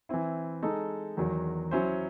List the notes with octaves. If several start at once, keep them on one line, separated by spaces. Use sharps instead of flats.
E3 C4 E4
G#3 D#4 A4
E2 D#3 F#3
F#3 C#4 E4 C5